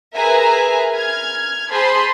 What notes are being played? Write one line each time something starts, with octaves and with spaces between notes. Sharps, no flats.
G#4 A#4 B4 E5 G#5 A#5
F6 G#6
G#4 C5 A5 B5 C6